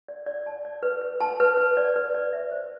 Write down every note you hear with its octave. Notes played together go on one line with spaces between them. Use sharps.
D5
D5
A5
D5
B4
B4
A5
B4
B4
D5
B4
D5
E5
C5